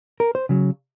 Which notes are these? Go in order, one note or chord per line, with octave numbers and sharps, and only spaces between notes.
A#4
C5
C#3 F#3